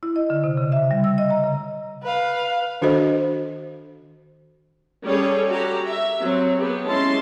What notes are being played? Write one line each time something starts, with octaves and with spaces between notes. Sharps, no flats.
E4
D#5
D3
C3
C#3
E5
G3
E6
D#5
A#5
C#3
B4 F5
D#3 D4 F#4 A4 C5 D#5
G3 C#4 G#4 A4 C#5
F#4 G4 A#5
E5
F#3 C4
B3 G4 G#4
G#3 C#4 E4 A5 C6